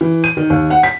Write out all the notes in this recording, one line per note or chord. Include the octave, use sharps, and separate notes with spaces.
E3
D#7
D#3
D#2
F#5
B6